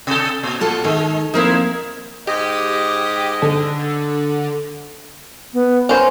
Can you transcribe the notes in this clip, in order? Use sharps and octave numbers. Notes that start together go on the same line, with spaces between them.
C3 A4
A#2
F4 A4 F#5
D#3 G#3
F3 A#3 C4 D#4 E4
G#2 G4 D#5
D3 A4
B3
C#4 A#4 C5